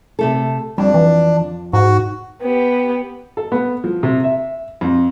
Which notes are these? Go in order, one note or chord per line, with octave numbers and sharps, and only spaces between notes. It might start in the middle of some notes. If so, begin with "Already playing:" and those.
C3 A3 A4
F2 G3 D4
E3
G#2 F#4
B3 G4
A4
B3
F3
C3
E5
F2